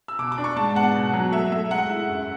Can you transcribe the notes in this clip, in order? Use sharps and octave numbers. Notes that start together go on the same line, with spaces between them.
E6
B2 D6
D6
D4
C#6
G#2 A5
B3 F#5
B2
F#3
A3 E5
A3 E5
G#3 F#5
E4
F#2